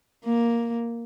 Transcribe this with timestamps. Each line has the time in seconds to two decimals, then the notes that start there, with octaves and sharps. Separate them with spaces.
0.24 A#3